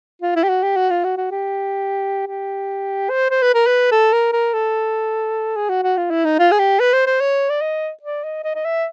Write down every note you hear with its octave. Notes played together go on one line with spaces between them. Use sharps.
F4
E4
G4
F#4
G4
F#4
F4
F#4
F#4
G4
G4
C5
C5
B4
A#4
B4
A4
A#4
A#4
A4
G#4
F#4
F#4
F4
E4
D#4
F4
G#4
G4
B4
C5
C5
C#5
D5
D#5
D5
D#5
D#5
D#5
E5